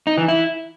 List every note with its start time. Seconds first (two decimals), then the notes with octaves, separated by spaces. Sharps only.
0.07 D#4
0.18 E3
0.28 E4